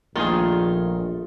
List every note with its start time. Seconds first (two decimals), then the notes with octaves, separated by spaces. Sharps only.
0.16 A#1 D#3 A3 D#4 F4 G#4